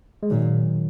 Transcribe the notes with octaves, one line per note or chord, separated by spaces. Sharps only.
G#3
A#2 D#3 F#3